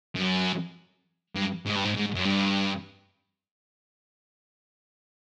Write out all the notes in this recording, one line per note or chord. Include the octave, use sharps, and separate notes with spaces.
F#2
G2
G#2
G2
G#2
G#2
F#2
G2